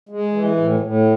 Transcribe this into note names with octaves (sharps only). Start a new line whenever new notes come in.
G#3
E3
A2
A2